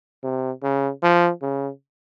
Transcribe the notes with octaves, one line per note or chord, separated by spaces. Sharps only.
C3
C#3
F3
C#3